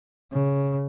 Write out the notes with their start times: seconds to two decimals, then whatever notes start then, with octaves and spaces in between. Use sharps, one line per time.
0.32 C#3